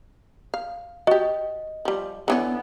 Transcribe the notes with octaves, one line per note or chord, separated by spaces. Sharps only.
F5
F#4 G4 D#5
F3 G3
D3 E3 B3 C#4